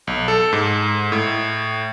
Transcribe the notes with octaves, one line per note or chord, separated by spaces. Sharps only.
B1
A4
G#2
A2